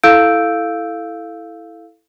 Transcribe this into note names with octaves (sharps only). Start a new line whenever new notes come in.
E4 A4 F5 E6 G6 D7